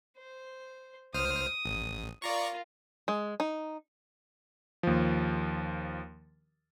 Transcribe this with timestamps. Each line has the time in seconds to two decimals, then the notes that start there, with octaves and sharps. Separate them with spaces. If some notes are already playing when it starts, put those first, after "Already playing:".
0.17 C5
1.14 C#2 C5 D#6 F6
1.65 A1
2.22 F4 A#4 D5 A#5 C#6
3.08 G#3
3.40 D#4
4.83 D#2 F3